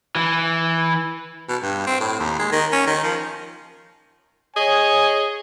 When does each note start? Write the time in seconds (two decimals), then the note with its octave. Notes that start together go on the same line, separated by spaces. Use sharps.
0.15 E3
1.49 B2
1.63 G2
1.87 C4
2.00 A2
2.20 D#2
2.39 G#3
2.52 D#3
2.72 C#4
2.87 D#3
3.04 F3
4.56 G#4 C#5 D#5 G#5